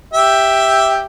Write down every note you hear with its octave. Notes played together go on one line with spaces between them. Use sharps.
G4 E5